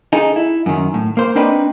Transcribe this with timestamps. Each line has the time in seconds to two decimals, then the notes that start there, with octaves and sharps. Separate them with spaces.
0.13 D#4 G#4 A4
0.36 E4
0.66 F#2 D#3
0.94 A2
1.17 A#3 C5
1.35 A#3 C4 D4 D#4 B4 G5